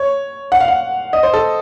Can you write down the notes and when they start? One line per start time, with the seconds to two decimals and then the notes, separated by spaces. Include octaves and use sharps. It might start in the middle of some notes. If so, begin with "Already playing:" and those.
Already playing: C#5
0.52 F#5
0.60 F5
0.68 F#5
1.13 D#5
1.23 C5
1.34 A4